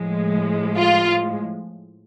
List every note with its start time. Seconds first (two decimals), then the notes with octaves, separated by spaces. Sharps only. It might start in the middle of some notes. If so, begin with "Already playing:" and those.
Already playing: A2 F3 G#3
0.77 F4